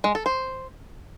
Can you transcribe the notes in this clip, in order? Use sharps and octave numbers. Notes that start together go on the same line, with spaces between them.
G#3
A4
C5